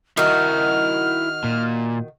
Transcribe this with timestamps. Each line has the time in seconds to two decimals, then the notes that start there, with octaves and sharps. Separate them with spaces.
0.17 D#3 E4 F#4 A#4 F6
1.44 A#2